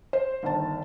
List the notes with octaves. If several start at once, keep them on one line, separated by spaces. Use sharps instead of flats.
C5
G1 D#3 A5